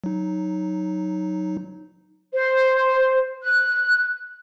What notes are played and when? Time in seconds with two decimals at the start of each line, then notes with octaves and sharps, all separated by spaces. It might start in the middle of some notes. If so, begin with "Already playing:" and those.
0.04 F#3 D#4
2.33 C5
3.43 F#6